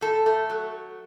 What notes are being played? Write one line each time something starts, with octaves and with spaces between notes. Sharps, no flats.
A2 A4
A3
F#3